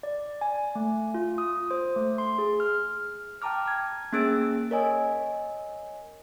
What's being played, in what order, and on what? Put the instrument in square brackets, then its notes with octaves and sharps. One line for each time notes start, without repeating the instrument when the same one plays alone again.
[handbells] D5
G#5
A3
F4
D#6
C5
A3
C6
G#4
F6
[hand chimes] G5 A5 A#5 D6 F6
G#6
A#3 C#4 G#4 E6 A6 D7
A#4 C#5 D#5 G#5